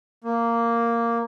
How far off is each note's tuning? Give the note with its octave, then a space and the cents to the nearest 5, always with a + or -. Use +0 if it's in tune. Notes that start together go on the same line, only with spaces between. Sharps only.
A#3 -5